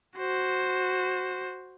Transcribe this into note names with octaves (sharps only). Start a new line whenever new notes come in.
F#4 C5